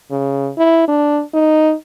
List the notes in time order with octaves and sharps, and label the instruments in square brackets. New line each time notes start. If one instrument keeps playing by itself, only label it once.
[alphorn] C#3
E4
D4
D#4